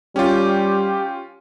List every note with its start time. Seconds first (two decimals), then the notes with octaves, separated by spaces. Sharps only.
0.16 G3 C#4 F4 G4